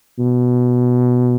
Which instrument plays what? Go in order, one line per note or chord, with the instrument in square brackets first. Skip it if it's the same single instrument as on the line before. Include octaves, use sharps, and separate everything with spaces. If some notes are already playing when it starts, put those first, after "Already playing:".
[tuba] B2